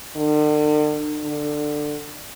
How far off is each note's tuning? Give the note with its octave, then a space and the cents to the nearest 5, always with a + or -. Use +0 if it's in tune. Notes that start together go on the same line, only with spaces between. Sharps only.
D3 +45
D3 +15